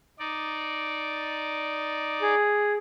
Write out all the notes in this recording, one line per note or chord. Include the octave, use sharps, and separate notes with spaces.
D#4 D5
G#4